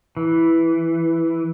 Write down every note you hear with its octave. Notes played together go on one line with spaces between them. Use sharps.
E3